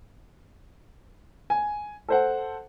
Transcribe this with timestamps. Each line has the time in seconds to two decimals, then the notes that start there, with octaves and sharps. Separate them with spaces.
1.50 G#5
2.08 A4 C5 F#5